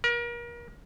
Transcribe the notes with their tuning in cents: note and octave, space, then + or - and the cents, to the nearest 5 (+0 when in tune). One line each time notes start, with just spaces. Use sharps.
A#4 +35